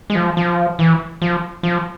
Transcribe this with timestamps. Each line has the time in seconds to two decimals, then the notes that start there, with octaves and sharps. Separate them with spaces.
0.10 G#3
0.15 F3
0.37 F3
0.79 E3
1.22 F3
1.63 F3